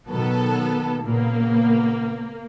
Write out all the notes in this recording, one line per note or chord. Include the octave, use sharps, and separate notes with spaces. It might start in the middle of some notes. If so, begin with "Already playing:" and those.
B2 D#3 F#3 B3 A4
A#2 C#3 A#3 B3